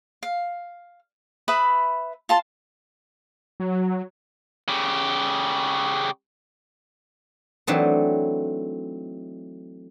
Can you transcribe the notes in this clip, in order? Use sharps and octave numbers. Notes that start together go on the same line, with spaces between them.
F5
B4 E5 B5 D#6
F4 A5 C6
F#3
C#3 G4
E3 F#3 A3 C4 D4 D#4